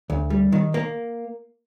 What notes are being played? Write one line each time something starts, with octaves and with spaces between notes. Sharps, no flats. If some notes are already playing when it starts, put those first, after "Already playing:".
D2
G3
D#3
A#3